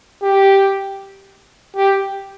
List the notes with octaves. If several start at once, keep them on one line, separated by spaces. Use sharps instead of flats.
G4
G4